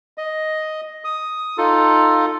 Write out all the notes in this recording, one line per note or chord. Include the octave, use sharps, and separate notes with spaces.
D#5
D#6
D#4 F4 A4